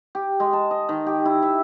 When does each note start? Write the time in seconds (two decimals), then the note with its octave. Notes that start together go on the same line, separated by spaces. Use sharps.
0.15 G4
0.40 G#3
0.53 A5
0.71 D#5
0.89 D#3
1.07 G4
1.26 E4
1.43 E5